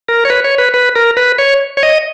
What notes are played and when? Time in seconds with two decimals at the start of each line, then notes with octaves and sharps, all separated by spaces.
0.08 A#4
0.25 C#5
0.30 B4
0.44 C#5
0.58 B4
0.74 B4
0.96 A#4
1.17 B4
1.38 C#5
1.77 C#5
1.83 D#5